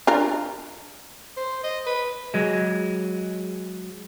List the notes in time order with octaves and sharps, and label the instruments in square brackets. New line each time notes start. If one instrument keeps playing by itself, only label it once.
[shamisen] D4 F4 A#4
[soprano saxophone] C5
D#5
B4
[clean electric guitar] F#3 G#3